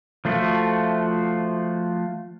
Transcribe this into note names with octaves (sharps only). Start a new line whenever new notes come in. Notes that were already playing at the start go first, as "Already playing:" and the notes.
F3 A3 F4 F#4